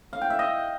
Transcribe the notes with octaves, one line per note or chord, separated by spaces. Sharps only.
F5
G5
E5
D#5